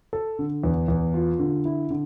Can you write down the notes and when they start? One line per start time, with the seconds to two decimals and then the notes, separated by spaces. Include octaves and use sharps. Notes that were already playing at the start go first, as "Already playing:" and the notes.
0.13 A4
0.39 D3
0.64 E2
0.88 E2
1.14 F4
1.39 D3
1.65 E4
1.90 D3